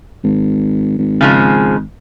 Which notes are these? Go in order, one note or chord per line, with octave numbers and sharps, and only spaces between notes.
G#1
G#1
C#3 F3 G#3